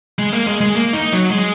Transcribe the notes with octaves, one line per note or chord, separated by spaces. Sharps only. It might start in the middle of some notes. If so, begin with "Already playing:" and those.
G#3
A#3
G#3
G#3
A#3
D#4
F#3
G#3